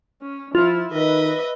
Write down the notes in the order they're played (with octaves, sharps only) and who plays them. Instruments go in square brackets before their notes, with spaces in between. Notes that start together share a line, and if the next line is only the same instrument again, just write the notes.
[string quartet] C#4
[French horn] F3 [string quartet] E4 [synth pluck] F4
[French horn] D#3 [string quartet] B4 D#5 E5